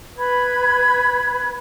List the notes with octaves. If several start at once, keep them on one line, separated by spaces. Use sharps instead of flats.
B4 B5 G#6